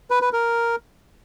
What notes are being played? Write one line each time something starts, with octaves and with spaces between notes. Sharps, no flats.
B4
B4
A#4